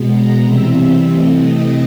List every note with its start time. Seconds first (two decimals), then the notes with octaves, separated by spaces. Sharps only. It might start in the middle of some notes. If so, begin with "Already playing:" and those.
Already playing: B2 G#3 B3
0.11 A#5
0.43 C3 E3 G3 C4 E5
1.08 C3 E3 A3 C4 D#5
1.40 D#5